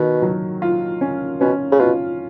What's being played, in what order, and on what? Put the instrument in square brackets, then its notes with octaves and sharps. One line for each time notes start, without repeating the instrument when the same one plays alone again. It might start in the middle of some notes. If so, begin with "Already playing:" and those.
Already playing: [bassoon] B2 [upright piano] D#3
[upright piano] F#3
F4
C#4
[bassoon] B2 [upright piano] C#4
[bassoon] C#3
[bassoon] B2 [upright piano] F4